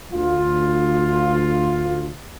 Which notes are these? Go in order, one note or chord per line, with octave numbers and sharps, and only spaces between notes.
D2 F4